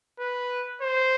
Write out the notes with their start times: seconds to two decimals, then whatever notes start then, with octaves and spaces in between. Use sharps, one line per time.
0.19 B4
0.81 C5